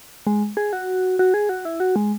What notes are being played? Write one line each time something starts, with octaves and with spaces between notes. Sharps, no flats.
G#3
G#4
F#4
F#4
G#4
F#4
E4
F#4
G#3